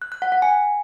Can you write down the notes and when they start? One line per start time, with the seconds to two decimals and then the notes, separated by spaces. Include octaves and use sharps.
0.02 F#6
0.12 F#6
0.22 F#5
0.32 F#5
0.42 G#5